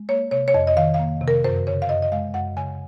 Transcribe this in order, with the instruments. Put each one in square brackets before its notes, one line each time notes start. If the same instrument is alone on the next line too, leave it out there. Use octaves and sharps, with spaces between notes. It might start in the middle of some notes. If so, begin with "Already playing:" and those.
Already playing: [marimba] G#3
A#3 C#5
C3 C#5
C#5
F2 D#5
D#5
D#3 F5
F5
A#3
C3
A#4
F#2 C5
C#3 C#5
F5
F#2 D#5
D#5
G#3 F5
F#2 F#5
C#3 G#5